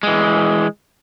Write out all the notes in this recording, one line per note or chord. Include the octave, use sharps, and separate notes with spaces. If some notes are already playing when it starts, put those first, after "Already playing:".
E3 G#3